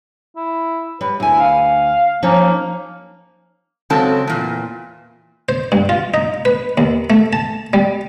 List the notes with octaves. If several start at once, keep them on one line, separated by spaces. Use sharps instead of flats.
E4
G3 B4
D2 E4 G#5
F5
F3 A#3 C#4 D#4
C#3 F#3 G#3 C4 A4 A5
E2 A#2
C5
G2
F4
D#4
B4
D#2
A3
A5
G3